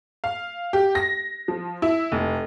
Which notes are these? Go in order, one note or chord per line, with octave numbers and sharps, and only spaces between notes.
F5
G4
A#6
F3
E4
F1